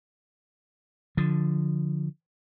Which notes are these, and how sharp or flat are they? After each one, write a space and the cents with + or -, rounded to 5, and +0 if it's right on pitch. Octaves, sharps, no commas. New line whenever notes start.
D3 +0 F3 +10